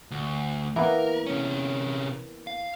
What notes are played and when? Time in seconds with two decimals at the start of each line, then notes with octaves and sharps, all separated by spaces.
0.11 D2
0.76 E3 A#3 B3 A#4
1.26 C3 C#4
2.47 F5